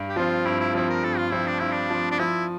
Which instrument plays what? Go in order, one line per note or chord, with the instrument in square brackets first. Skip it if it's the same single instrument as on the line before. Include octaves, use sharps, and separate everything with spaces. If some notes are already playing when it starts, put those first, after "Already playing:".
Already playing: [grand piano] G2
[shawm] G4
[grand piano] F3 C4 [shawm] F4
[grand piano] G2 [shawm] E4
[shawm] E4
[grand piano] F3 C4 [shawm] E4
[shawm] A#4
[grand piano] G2 [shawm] A4
[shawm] F4
[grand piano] F3 C4 [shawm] E4
[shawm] D4
[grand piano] G2 [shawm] E4
[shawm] D4
[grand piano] F3 C4
[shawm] D4
[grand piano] F3 [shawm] E4